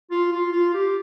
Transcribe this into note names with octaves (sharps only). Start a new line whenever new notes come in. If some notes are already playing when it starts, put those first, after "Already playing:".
F4
F4
F4
G4